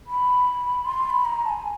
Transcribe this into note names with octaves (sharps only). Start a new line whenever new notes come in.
B5
C6
C6
B5
A#5
A5
G#5